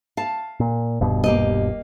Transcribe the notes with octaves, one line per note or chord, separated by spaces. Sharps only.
F5 A5
A#2
D#1 G2 B2
A#3 G4 D#5